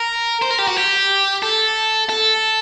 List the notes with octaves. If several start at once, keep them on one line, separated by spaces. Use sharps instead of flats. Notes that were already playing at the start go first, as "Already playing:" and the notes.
Already playing: A#4
C5
A#4
G4
F#4
G4
A4
A4